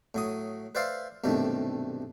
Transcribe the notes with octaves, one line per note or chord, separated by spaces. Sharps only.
A2 F#3 D#6
B4 C5 D5 E5 F5 C6
B1 G2 C3 D#3 A3